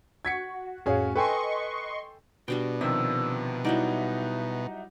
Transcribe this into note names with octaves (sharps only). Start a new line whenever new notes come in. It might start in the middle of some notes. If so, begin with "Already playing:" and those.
F#4 G#6 B6 C#7
F2 A2 C#4 F#4 G#4 C#5 F5 G#5
A4 B4 D#5 G5 G#5 C6 C#6
B2 G3 D4 F#4 G5
C3 D#3 F3 E5 E6
F#3 G3 D#4 E4 D5 E5 F#5